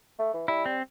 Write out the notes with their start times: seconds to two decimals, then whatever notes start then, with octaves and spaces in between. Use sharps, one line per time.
0.19 A3
0.34 E3
0.48 G3 E4
0.66 C4